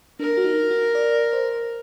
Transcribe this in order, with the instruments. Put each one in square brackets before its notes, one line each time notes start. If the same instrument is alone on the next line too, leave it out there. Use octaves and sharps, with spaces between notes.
[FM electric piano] D4 [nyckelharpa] A#4
[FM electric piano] F#4
D#4
F#4
D5
C5